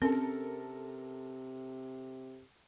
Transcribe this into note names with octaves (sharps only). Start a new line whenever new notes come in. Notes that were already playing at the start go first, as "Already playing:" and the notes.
C3 C4 C#4 A4 A#4